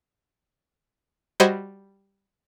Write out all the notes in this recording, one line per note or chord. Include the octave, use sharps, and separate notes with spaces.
G3 F#4 C5 D#5 B5 G#6